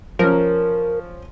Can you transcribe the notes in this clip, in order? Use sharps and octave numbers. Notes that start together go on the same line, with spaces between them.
F3 C#4 A#4